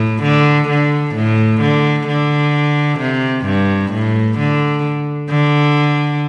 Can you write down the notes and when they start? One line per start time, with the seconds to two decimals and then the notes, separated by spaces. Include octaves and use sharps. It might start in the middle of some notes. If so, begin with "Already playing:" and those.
Already playing: A2
0.23 D3
0.69 D3
1.15 A2
1.61 D3
2.07 D3
2.99 C3
3.45 G2
3.92 A2
4.38 D3
5.30 D3